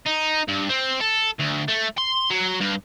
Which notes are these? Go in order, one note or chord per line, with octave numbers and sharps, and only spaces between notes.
D#4
G2
C4
A4
D2
A3
C6
F#3
G2